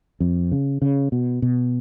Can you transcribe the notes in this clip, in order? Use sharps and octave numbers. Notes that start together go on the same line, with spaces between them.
F2
C#3
C#3
B2
B2